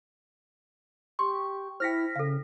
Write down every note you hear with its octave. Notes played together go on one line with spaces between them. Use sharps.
G4 C6 C#6
E4 C5 G5 F6 A#6 B6
C#3 A4 F5